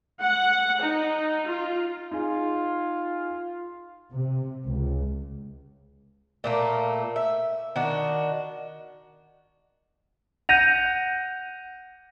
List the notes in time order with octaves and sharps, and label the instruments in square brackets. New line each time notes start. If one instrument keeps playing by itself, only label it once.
[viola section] F#5
D#4
F4
[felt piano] D#4 G#4 [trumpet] F4
[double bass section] C3
C#2
[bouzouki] A#2 A3 A#3
E5
D#3 D4 F#4
[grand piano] F#5 A#6 [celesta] G6 D#7 F7